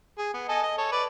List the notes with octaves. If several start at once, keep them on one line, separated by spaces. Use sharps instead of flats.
G#4
B3
A4 D#5 G#5
D#5
A4 C#5
B4 D5